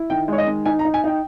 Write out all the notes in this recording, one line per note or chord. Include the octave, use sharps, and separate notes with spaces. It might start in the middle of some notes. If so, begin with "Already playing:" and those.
Already playing: E4
D#3 G5
G#3 C#5
D#5
D#3
D#4 G#5
A#5
D#4
G#5
D#4 G5